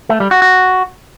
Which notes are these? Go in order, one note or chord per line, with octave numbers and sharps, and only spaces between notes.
A3
G3
F#4
F#4